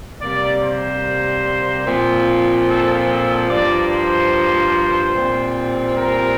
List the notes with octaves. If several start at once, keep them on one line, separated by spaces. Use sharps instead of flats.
C3 G3 A#3 D5
C5
A#2 F3 C4
A4
A4
G2 F3 A#3 D5
C5
A#2 G3 C4
A#4